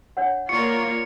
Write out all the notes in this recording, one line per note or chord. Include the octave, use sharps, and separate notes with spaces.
D4 C#5 F#5
A#3 F4 A#4 C#5 D5 C#6 C#7